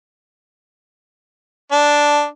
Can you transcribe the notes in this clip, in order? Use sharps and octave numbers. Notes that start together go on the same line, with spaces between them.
D4